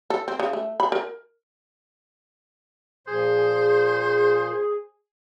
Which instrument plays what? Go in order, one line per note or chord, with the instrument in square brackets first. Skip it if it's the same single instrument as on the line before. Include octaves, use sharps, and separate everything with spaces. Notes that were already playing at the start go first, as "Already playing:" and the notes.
[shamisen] A4
C4
C#3
A3
B5
A#4
[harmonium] A#2 F3 [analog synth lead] G#4 [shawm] C5